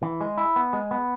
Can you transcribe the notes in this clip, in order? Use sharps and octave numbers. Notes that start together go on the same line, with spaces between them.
E3
G#3
E4
B3
G#3
B3